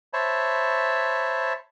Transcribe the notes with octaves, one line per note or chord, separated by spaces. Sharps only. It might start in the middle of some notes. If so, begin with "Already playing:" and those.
C5 C#5 E5 A5 B5